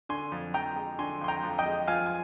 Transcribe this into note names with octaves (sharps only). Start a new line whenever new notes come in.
D3 G#5 C6
F2
F2 G5 A#5
G#3
D3 G#5 C6
F2 C6
G5 A#5
F2
D#5 G5
G#3
F3 F5 G#5
G#5